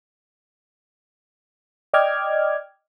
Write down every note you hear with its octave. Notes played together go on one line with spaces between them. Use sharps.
D5 D#5 G5 D6 F6 G#6